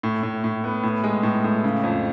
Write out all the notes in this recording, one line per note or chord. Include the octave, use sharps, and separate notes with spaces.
A2
A2
A2
B3
A2
G#3
A2
A2
C#3
F2